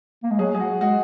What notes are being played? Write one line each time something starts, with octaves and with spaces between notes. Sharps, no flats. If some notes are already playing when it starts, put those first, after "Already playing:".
A#3
G#3
F#3 G#4
G#4
F#4
G#3 F#4